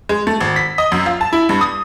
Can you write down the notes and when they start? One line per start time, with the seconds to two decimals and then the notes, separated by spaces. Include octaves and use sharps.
0.09 G#3
0.27 A3
0.41 G#1
0.56 B6
0.78 D#5
0.92 F#2
1.06 F4
1.21 A5
1.33 E4
1.49 G2
1.61 D#6